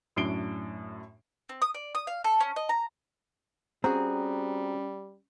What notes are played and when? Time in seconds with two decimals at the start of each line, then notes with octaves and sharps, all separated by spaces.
0.16 F#2 A2 D4 C7 D7 G7
1.49 C4
1.62 D#6
1.74 D5
1.95 D#6
2.07 F5
2.24 A4
2.41 C#4
2.56 D#5
2.69 A#5
3.84 G3 C4 C#4 F#4 G#4 A#5